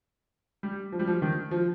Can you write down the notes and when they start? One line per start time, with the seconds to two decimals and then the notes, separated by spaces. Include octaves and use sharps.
0.63 G3
0.92 F3
0.99 G3
1.07 F3
1.22 D#3
1.51 F3